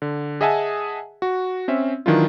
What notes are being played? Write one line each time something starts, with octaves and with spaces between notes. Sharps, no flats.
D3
G#4 D#5 E5 F#5 G#5 A5
F#4
C4 C#4 E5
D#3 E3 F#3 D4 E4 F4